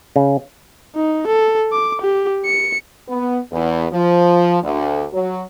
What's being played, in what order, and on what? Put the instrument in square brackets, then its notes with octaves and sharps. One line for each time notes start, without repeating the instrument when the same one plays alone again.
[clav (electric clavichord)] C#3
[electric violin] D#4
A4
D6
G4
C#7
[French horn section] B3
E2
F3
D2
F#3